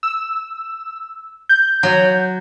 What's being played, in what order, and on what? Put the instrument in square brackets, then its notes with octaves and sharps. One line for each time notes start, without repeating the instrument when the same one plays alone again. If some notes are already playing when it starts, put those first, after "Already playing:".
[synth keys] E6
G6
[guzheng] F#3